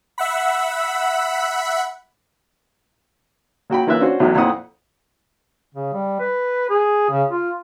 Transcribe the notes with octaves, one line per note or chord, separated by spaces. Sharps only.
E5 F#5 B5
A#2 F#4 G5 B5
E3 A#3 F4 B4 E5 F#6
C#4 D4 F#4 C5
A1 E2 A2 F#3
F2 A#2 C4 E4 F#5 D#6
C#3
G3
B4
G#4
C#3
F4